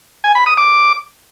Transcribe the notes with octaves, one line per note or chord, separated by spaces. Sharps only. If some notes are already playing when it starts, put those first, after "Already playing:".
G#5
B5
D#6
D6